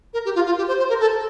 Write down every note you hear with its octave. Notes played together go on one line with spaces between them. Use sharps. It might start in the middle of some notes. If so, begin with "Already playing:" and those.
A#4
G4
F4
F4
G4
C5
C5
A#4
A4